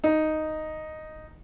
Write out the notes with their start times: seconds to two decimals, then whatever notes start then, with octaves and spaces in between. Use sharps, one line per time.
0.04 D#4